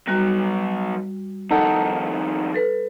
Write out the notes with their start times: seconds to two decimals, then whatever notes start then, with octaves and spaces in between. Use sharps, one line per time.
0.07 B2 F#3 G3 F#4
1.51 F2 D#3 D#4 A4 F#5
2.54 A4 B4